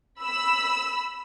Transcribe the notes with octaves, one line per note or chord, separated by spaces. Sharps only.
B5 E6